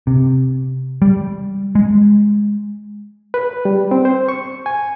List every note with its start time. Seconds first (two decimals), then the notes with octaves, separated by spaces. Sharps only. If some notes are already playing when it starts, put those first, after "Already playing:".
0.07 C3
1.02 G3
1.75 G#3
3.34 B4
3.65 G3
3.91 C4
4.05 C5
4.29 C#6
4.66 G#5